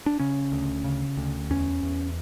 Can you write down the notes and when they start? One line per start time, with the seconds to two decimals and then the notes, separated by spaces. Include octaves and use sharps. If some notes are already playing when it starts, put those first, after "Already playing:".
0.06 D4
0.19 C#3 C#4
0.52 D2
0.84 C#3
1.17 D2
1.50 E2 C#4
1.83 E2